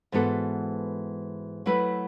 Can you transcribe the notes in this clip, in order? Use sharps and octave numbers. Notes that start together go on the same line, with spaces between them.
G#2 E3 B3 F#4 A4
F#3 A3 E4 B4